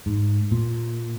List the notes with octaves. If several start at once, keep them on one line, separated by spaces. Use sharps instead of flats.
G#2
A#2